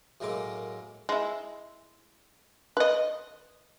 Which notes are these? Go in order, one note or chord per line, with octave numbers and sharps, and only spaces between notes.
F#2 A2 G#3 A#3 D6
G#3 E4
B4 D#5